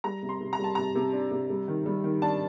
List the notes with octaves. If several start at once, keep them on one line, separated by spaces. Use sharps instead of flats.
G3 A#5
C3
C6
C3
A#5
G3 A5
C3 A#5
C3
D4
C3
G3
D#3
G3
D#3
D4 A5